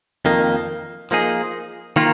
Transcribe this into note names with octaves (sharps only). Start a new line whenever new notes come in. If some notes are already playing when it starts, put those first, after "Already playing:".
F2 D#3 A#3
F3 A#3 D#4 G#4
D#3 A#3 F4